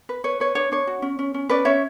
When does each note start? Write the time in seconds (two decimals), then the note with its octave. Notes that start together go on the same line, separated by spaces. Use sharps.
0.09 B4
0.24 B4 C#5
0.40 B4 C#5
0.55 D4 C#5
0.72 D4 C#5
0.87 F#4
1.02 C#4
1.19 C#4
1.34 C#4
1.49 C#4 B4 D5
1.65 C#4 C#5 E5